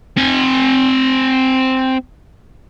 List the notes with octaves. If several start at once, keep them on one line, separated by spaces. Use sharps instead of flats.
C4 G#5